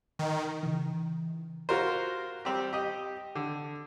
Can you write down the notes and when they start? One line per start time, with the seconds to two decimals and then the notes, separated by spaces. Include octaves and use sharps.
0.19 D#3
0.63 C#3 E3
1.69 F4 F#4 A#4 C5
2.45 G3 C4 G4
2.73 G4 D#5
3.35 D3